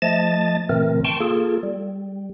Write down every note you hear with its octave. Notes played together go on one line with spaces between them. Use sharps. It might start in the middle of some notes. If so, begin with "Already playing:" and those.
F3 A3 D#5 A5 A6
A#2 C#3 E3 A3 C4 A#4
G5 A5 C6 C#6
A#3 F4 G#4 A4
G3